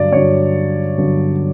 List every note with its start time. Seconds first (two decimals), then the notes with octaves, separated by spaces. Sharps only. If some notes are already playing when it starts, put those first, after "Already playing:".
Already playing: G2 D3 F#3 D5
0.12 G2 D3 F#3 C#5
0.98 G2 D3 F#3